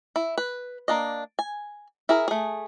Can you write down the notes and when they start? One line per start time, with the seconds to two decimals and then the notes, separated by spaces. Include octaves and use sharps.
0.16 E4
0.38 B4
0.88 A#3 D4 D#5
1.39 G#5
2.09 E4 G#4 A#4
2.28 A3 G#4